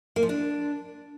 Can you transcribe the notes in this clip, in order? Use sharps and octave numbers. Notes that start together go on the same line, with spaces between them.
A#3
F3
D4